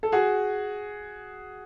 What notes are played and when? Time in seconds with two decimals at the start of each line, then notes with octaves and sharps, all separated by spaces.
0.03 A4
0.12 F#4 G#4